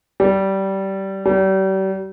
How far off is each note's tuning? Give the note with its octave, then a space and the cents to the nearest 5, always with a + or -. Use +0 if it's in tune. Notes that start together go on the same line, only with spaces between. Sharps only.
G3 -20
G3 -40